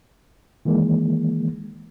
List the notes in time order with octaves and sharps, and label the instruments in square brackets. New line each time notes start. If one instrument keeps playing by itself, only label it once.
[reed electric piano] D#3 E3 G#3 A#3